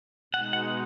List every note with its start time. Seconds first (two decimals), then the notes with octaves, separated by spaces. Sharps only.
0.33 B2 G#3 D#4 F#5
0.53 F#5